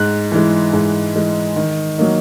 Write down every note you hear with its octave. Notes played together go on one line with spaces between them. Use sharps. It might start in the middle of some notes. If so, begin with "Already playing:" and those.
Already playing: G#2 F#6
E3 G#3
G#2
E3 G#3
D#3
F#3 A#3 D#4